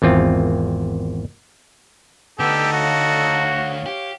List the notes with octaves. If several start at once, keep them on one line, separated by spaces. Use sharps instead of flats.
G#1 E2 C4 F4
D2 D3 B3 D#4 G4 A4 E6
F#4 C#5 F5
G4